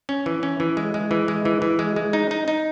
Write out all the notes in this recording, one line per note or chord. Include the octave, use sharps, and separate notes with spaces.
C#4
E3
C#4
E3
G#3
G#3
E3
G#3
E3
E3
G#3
G#3
D#4
D#4
D#4